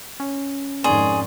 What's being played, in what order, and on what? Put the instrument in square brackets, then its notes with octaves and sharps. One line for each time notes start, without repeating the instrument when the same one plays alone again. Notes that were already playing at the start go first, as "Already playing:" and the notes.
[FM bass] C#4
[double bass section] F2 G#2 D#3 [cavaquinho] G#4 [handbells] D5 C6 C#6